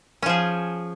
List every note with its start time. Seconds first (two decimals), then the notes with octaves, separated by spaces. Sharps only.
0.22 C#4
0.26 F3
0.29 G#4